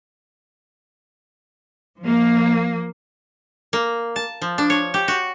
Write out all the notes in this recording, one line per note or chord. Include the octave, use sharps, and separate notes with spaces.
F3 A#3
A#3
A5
F3
D4
C#5
G4
F#4